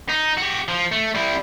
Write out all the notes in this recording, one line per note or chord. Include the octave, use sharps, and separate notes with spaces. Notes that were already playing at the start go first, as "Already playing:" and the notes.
D#4
F#4 G4
F3
A3
G3 E4